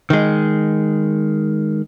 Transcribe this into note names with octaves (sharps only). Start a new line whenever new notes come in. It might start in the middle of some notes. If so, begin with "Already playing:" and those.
D#3 G#3